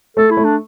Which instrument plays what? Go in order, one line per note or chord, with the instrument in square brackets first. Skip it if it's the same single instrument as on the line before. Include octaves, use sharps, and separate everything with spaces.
[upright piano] A3 [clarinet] A4
[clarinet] E4
[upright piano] A3
[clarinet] D4